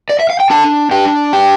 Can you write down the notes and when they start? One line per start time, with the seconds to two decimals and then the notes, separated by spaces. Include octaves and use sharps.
0.09 D5
0.19 E5
0.30 F5
0.40 G5
0.50 D4 A4 A5
0.91 D4 G4 G5
1.33 G4 G5